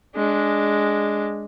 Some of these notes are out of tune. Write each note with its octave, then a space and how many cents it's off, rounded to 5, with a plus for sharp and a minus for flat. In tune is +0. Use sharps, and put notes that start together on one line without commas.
G#3 +0 D4 -5